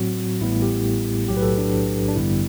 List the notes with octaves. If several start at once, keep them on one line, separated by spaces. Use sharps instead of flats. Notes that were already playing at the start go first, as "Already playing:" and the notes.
Already playing: A2 F#3 C4 F#4
A1 A2 G3 B3 E4
G4
B1 A2 F#3 G4
B4
A4
D4
D4
A1 G2 D3 G3 B3 E4